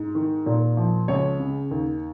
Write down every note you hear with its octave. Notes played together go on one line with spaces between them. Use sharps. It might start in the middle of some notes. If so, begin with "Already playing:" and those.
Already playing: G#2
D#3
A#2
F3
C#2 C#5
C#3
D#2